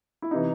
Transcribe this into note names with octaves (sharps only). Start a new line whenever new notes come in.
E4
C3 E3 D#4